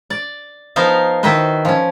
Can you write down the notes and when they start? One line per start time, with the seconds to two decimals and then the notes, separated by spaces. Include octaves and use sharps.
0.10 D5
0.76 F3 B3 D#4 A#4 C5 F5
1.23 D#3 E4 F#4 B4 C5
1.65 F3 C#4